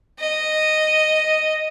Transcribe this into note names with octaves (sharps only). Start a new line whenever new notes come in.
D#5